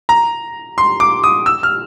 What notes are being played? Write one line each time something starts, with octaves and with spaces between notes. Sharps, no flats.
A#5
C6
D6
D#6
E6
F6